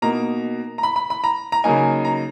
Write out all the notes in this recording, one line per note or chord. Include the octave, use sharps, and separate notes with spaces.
B2 A#3 D#4 A#5
A#5
B5
B5
B5
A#5
A#5
C#3 F#3 A#3 D#4 G#5
A#5